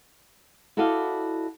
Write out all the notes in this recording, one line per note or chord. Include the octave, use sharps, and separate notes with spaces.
E4 F#4 A4 D5 D#5 F5